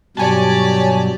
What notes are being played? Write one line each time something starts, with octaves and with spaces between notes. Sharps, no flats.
G2 B2 F#3 G4 C#5 D5 G#5 A5